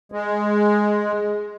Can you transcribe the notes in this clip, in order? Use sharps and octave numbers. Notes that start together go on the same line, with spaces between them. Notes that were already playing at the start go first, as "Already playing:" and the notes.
G#3